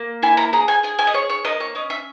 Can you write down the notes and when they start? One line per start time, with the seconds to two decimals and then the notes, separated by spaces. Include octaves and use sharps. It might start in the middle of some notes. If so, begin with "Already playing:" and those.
Already playing: A#3
0.23 E4 G#5
0.37 A#5
0.53 G#4 A#5
0.68 G#5
0.83 G#4 G#5
0.99 G#5
1.07 D#5
1.14 G#4 C#5
1.30 C#5
1.45 A#3 D#5
1.60 C#5
1.75 C#4 D#5
1.90 E5